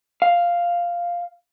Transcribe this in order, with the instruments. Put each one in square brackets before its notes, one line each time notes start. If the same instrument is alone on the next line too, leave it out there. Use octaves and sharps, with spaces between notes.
[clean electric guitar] F5